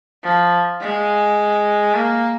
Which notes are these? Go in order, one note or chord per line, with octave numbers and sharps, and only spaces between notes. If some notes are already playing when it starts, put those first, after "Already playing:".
F3
G#3
A#3